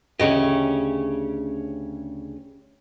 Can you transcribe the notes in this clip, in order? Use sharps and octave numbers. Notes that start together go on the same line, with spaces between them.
D2 C#3 C#4 G4 D#5